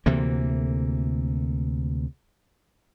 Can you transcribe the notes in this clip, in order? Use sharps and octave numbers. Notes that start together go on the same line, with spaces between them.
D2 C3 E3 A#3